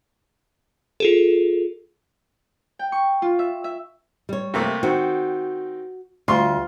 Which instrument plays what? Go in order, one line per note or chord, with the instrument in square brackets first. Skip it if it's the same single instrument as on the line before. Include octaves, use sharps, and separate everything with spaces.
[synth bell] F4 G#4 A4
[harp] G5
C#6
F4
E5
E5
[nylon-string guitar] G3 C#5
[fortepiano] C3 A3 A#3
[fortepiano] D#3 C4 [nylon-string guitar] F#4
[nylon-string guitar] D2 G3 [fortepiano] F4 C6